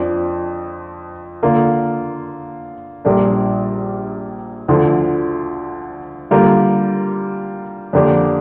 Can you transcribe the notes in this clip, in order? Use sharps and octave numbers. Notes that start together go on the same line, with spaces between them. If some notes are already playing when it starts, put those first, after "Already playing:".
Already playing: F2 F3 D4
D3 A#3 F4
A#1 A#2 G3 D4 A#4
D2 D3 F3
D3 G3 A#3 F4 A#4
F2 D3 A#3 D4 G4